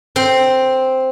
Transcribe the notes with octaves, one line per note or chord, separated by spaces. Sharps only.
C4 C5